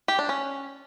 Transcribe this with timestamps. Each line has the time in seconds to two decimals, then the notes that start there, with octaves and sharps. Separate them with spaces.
0.08 G4
0.19 D4
0.29 C#4